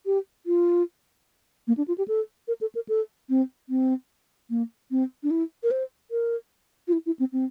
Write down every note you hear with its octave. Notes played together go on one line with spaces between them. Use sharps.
G4
F4
A#3
D4
F4
G4
A4
A#4
A4
A#4
A4
C4
C4
A#3
C4
D4
E4
A#4
C5
A#4
F4
E4
E4
C4
C4